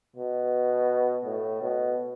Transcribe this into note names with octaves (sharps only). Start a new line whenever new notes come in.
B2
A2
B2